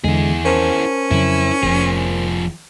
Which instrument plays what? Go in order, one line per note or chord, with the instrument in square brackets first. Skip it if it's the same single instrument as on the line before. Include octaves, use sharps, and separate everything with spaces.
[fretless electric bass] E2 [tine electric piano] D3 G#3 [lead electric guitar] E4 G#4
[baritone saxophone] C#4 [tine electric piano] A#4 C5 A5
[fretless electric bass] F2 C#3 F#3 [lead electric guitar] E4
[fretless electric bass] F1 [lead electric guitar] F3 G#4